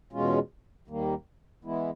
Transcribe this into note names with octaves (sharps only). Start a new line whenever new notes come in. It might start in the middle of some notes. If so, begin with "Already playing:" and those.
E2 B2 G#3 C#4 F4
D#2 D#3 G3 A#3
E3 G#3 B3 E4